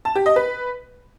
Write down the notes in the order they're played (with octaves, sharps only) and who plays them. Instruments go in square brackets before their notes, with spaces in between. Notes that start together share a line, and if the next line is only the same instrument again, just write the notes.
[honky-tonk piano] A5
G4
D#5
B4